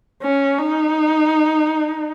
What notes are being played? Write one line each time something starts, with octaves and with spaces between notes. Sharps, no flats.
C#4
D#4